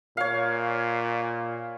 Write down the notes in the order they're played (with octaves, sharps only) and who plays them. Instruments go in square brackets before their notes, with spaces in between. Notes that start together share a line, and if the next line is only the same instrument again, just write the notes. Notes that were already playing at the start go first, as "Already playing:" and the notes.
[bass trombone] A#2 [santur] C#5 F5